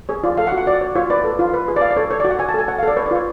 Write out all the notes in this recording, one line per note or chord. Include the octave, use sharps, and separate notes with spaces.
G#4 C#5
F4 D5
A4 F5
F#5
F#4
F#5
F#4 D5
C#5
F4 C#5
B4 D5
A4
F4
B4
G#4
D5
C#5 F5
D5
A4 C#5
A4 C#5
D5
F#4
F#5
C#5 G#5
A5
A4 G#5
C#5 F#5
F5
A4
D5
B4 C#5
D5
F4 C#5